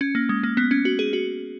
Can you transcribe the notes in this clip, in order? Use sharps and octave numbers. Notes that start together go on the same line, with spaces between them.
C#4
A#3
G#3
A#3
B3
C#4
F#4
G#4
F#4